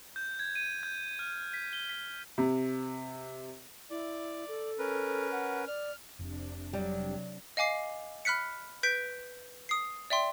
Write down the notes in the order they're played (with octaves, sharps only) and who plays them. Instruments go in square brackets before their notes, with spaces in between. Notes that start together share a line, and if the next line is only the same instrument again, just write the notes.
[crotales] G6
G#6
D#7
G6
F6
B6
G7
B6
[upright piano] C3
[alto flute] E4 [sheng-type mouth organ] D5
[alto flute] A4
[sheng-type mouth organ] C#4 A#4 B4
[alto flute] F#5
[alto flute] D5 [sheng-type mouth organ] F6
[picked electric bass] F1 [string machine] C3 D4
[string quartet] F#3 [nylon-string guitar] G3
[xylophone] D#5 F5 G#5 D6 C7
B5 F6 F#6 B6 C#7
B4 G6 B6 D7
D#6 C7
D5 E5 G5 C6